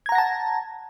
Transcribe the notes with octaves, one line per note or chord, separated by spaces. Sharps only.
F#5 A5 A#5 G#6 A#6